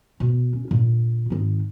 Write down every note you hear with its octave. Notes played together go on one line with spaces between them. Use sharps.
B2
C#4
A#2 D3
G#1 D#3